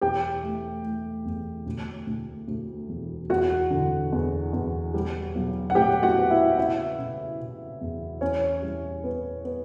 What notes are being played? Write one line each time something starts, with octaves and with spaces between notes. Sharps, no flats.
E1 G4 G5
A3
A3
E2
D2
D2
D2
E1
E2 F#4 F#5
D3
E2
E2
G3
B1
F#5
A2 G4 G5
F#4 F#5
B3
E4 E5
C#3 E4 E5
C#3
C#3
E2
E2 C#4 C#5
G3
B3
B3